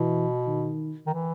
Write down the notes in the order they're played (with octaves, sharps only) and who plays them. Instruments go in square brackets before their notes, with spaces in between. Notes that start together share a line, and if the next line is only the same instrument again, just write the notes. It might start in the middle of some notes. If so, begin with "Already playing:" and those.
Already playing: [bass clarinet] B2 [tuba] E3
[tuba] D#3
[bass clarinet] D#3
E3